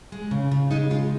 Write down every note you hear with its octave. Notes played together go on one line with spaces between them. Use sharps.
G#3
C#3
C#3 F4
G#3 D#4
G#3 F4